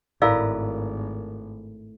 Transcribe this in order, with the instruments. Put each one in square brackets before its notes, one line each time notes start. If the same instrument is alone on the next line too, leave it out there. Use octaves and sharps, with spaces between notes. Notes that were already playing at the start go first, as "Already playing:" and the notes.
[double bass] G#1 [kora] A2 A#4 B4 [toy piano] D5 F5 E6